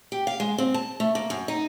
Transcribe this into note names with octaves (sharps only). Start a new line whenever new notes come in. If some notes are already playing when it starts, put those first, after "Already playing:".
G4
F5
G#3
C4
A5
A3
A#3
F#2
D#4